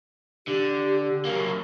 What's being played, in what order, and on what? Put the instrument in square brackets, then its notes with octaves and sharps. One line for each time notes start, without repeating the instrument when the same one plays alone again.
[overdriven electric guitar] D3 [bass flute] G4
[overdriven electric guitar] F#3 A#3